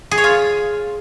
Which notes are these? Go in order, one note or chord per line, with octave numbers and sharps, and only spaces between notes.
G#4
C#5
F4